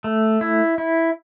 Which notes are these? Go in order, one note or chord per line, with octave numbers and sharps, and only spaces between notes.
A3
E4
E4